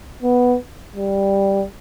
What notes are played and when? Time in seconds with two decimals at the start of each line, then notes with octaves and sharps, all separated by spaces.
0.23 B3
0.97 G3